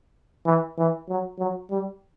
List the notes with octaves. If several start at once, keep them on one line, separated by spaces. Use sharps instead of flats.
E3
E3
F#3
F#3
G3